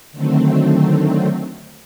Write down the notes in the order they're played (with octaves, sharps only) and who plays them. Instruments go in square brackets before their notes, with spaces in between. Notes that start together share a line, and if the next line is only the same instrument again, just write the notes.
[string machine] D3 D#3 F#3 A3 C4